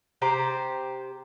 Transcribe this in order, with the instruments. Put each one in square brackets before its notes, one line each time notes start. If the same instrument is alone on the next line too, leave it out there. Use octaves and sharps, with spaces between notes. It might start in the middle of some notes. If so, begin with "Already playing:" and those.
[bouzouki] C3 G4 C5 A#5